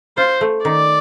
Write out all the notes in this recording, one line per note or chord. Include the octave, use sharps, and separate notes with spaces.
F4 C5
A3
D#3 D5